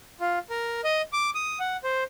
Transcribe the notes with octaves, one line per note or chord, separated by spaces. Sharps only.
F4
A#4
D#5
D6
D#6
F#5
C5